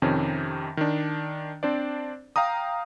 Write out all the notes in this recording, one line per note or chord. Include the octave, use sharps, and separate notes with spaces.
F2 C3 D#3 C#4
D#3 D4
C4 D4 C5 D5
F5 G5 A#5 D#6